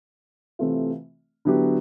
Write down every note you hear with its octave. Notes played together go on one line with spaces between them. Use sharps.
C3 E3 A3 C4 F4
D3 F#3 B3 E4 G4